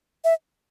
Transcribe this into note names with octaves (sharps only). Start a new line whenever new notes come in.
E5